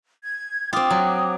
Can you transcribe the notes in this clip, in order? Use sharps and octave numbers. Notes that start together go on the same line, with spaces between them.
G#6
C4 F4 G5 D6 D#6
F#3